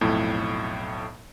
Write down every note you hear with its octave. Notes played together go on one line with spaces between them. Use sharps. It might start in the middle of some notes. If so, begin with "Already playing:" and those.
B1 F2 A2